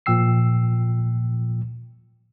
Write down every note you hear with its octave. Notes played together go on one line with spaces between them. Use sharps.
A#2 F3 G5 E6 C7